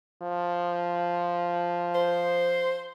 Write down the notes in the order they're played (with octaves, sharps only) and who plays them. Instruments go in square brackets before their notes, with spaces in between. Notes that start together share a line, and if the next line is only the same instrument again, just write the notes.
[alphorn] F3
[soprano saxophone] C5